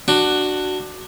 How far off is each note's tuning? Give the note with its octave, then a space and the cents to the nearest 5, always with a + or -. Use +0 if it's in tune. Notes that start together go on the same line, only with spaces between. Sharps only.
D4 +15 F#4 +5